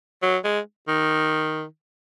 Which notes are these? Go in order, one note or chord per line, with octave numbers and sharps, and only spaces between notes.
F#3
G#3
D#3